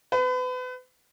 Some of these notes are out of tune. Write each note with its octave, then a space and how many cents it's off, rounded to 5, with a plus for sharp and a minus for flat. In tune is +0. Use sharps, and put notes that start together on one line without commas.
B4 +35